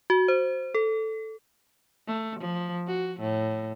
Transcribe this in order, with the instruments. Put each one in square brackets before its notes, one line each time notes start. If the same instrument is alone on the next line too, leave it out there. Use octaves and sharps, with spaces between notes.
[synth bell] F#4
C5
A4
[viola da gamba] A3
F3
F#4
A2